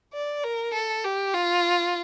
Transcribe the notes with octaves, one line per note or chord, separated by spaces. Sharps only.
D5
A#4
A4
G4
F4